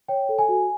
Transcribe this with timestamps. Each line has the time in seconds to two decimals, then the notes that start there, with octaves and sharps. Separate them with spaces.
0.08 C#5 G5
0.29 A4
0.39 G#5
0.49 F#4